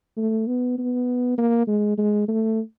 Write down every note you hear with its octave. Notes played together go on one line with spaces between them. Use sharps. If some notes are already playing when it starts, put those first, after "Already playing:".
A3
B3
B3
A#3
G#3
G#3
A3